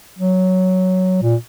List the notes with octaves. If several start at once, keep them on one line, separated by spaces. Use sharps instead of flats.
F#3
A#2